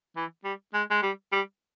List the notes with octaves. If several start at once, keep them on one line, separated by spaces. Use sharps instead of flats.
E3
G3
G#3
G#3
G3
G3